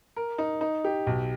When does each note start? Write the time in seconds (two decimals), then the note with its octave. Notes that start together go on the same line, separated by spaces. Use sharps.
0.16 A#4
0.38 D#4
0.61 D#4
0.84 G4
1.07 B1